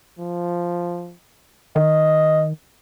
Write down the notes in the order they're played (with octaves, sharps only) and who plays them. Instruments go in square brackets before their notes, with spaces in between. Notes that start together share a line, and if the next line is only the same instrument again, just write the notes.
[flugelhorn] F3
[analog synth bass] D#3 [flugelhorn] D#5